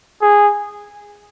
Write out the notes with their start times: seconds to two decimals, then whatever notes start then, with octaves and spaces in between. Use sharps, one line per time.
0.22 G#4